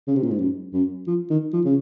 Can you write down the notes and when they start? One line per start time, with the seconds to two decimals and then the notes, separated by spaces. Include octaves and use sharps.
0.08 C#3
0.16 C3
0.23 A#2
0.31 G#2
0.38 F#2
0.73 F#2
1.07 F3
1.30 D#3
1.53 F3
1.65 C#3